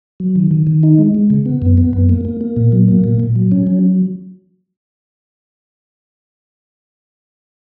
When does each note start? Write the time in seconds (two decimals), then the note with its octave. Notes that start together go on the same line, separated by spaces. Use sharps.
0.20 F#3
0.36 D#3
0.51 D#3
0.67 D#3
0.83 D#4
0.98 G#3
1.14 G#3
1.30 C#3
1.46 B3
1.62 F#2
1.78 B3
1.93 F#2
2.09 A#3
2.25 A#3
2.41 A#3
2.56 A#2
2.72 F#3
2.88 A#3
3.04 A#2
3.20 A#2
3.36 F#3
3.52 C#4
3.67 F#3